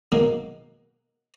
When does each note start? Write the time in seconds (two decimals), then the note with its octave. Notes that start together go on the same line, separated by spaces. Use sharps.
0.12 B2 D#3 F#3 G#3 A#3